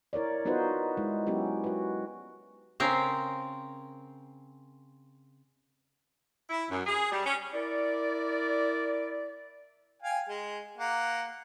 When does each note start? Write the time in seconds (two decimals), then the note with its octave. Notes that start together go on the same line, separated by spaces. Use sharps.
0.13 E4 A#4 C#5 D5
0.45 B3 D#4 F4 F#4 B4 C5
0.97 G#3 E4
1.27 F#3 B3 C#4 E4 F#4 G4
1.64 F#4 B4
2.80 C#3 C4 A#4
6.50 E4
6.69 F#2
6.86 G#4
7.12 G3
7.25 C#4
7.54 E4 A#4 D5
10.02 F5 G5 G#5
10.29 G#3
10.78 A#3 F#5